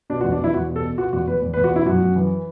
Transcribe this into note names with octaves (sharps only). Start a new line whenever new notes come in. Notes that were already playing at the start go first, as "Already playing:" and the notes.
B2 D4
F#4
E2
D4
E2 E4
E2 F#4
B2
A4
B2
B2 F#4
E2 F#4
E2 B4
E2
B4
E2
F#4
B2 E4
F#2 F#4
F#2
E3